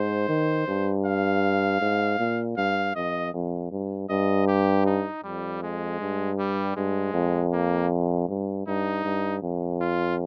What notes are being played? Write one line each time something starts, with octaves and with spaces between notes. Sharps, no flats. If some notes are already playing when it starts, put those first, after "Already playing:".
Already playing: G#2 C5
D#3
G2
F5
G#2
A#2
G2 F5
F2 D#5
F2
G2
G2 D#5
G4
D#4
F2 G3
G#3
G2
G3
G2 G#3
F2
A#3
G2
G2 D#4
G2
F2
F4